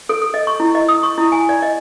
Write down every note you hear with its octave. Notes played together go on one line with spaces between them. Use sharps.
A4
A4
D#5
C#6
E4
D#5
D#6
C#6
E4
G#5
D5
D#5